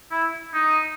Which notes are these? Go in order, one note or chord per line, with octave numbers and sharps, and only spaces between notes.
E4
D#4